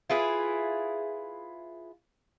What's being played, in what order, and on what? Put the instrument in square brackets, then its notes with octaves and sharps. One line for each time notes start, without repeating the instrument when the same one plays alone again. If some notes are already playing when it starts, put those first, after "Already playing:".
[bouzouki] E4 F4 G#4 B4